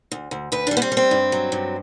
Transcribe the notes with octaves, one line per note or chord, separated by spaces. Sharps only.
D2
D2
D2 B4
G3 D4
B3
C4
G3
C4
G2
F#3
G2